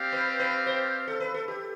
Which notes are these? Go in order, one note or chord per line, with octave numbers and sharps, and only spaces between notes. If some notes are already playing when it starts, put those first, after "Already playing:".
Already playing: C4 G4 D5 F5
B4
B4
C5
A4
B4
A4
G4